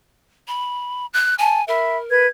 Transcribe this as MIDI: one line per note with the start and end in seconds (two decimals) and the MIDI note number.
0.48 1.06 83
1.13 1.35 90
1.38 1.64 80
1.38 1.59 81
1.68 2.25 70
1.68 1.98 76
1.68 1.98 83
2.10 2.27 71
2.10 2.27 92